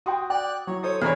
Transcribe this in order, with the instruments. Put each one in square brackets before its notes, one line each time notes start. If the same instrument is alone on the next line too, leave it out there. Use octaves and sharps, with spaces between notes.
[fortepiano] F#4 [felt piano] G5 C6 D#6
[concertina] D5 F#6 [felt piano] G5
[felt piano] F#3 E4 [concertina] C#5
[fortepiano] A4 C5 C#5 [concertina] D#6
[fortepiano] E2 D4 C#5 [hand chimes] B3 [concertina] A#4 B5